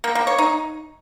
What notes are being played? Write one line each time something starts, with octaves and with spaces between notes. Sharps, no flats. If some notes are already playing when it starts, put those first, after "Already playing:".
A#3
A#3
C#5
D#4